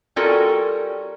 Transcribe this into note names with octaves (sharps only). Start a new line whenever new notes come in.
G3 C#4 F4 F#4 A4 A#4